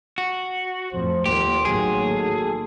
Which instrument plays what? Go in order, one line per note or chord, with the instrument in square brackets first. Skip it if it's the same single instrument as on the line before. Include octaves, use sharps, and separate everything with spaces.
[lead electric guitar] F#4
[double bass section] F2 A2 F3 [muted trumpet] C5
[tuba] G1 [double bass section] D#2 A#3 [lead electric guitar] G4 [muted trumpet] C6
[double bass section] A1 D#3 A#3 [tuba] F#3 [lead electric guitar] G#4
[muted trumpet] A4